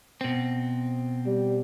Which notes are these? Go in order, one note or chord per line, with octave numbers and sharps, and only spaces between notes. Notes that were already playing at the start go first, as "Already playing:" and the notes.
B2 C4
G3